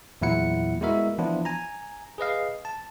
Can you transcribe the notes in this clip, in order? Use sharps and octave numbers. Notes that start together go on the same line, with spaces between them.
E2 A#2 F#3 E4 F#5 C#7
G#3 B3 E4 F#4 A#4 E5
E3 F3 B3 D4 E4 F4
G#5 A#5
G#4 B4 D#5 F5
A5